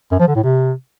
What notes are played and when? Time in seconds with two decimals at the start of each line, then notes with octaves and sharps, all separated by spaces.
0.11 F#2
0.19 F3
0.27 D3
0.35 A2
0.43 C3